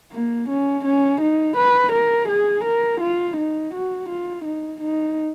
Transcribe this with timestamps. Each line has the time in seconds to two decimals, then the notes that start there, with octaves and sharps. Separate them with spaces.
0.12 A#3
0.49 C#4
0.85 C#4
1.21 D#4
1.57 B4
1.92 A#4
2.28 G#4
2.64 A#4
3.01 F4
3.37 D#4
3.74 F#4
4.09 F4
4.45 D#4
4.81 D#4